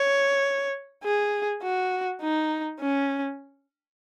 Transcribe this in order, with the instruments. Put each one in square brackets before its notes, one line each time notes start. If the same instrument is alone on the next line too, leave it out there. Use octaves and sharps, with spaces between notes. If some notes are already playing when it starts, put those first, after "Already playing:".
Already playing: [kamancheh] C#5
G#4
F#4
D#4
C#4